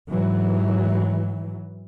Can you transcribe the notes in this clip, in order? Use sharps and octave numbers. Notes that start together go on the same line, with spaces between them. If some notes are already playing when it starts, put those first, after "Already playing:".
G#2 E3 F#3